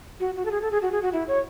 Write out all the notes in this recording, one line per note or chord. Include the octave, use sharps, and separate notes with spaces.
F#4
F#4
A4
G#4
A4
G#4
F#4
G#4
F#4
E4
C#5